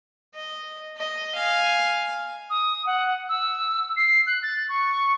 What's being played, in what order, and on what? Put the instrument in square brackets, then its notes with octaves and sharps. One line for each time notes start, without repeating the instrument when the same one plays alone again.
[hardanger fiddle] D#5
D#5
F5 G#5
[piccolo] D#6
F#5
E6
C7
F#6
A6
C#6